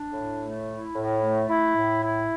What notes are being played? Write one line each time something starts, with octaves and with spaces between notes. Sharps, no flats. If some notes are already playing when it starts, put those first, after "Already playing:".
Already playing: D4
A2
A3
E4
A2
A3
E4
A2
E4